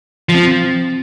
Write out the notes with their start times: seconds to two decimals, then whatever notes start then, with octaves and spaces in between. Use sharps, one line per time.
0.29 F3
0.35 C4